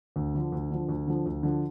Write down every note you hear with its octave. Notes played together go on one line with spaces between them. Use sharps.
D2
D3 F3
D2
D3 F3
D2
D3 F3
D2
D3 F3